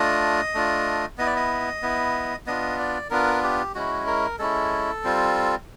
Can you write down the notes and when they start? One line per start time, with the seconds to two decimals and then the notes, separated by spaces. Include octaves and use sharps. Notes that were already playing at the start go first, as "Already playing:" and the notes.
Already playing: A3 D4 F4 D#5
0.55 A3 D4 F4
1.18 B3 E4 D#5
1.26 D5
1.36 D#5
1.83 B3 E4
2.46 B3 D4 F4 D#5
2.79 D5
3.10 B3 D4 F4 A#4
3.43 G4
3.75 G#3 C#4 E4 F#4
4.07 A#4
4.39 G#3 C#4 E4 A4
5.04 G3 C4 F4